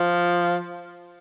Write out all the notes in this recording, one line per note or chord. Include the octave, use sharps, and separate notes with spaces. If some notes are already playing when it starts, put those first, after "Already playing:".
Already playing: F3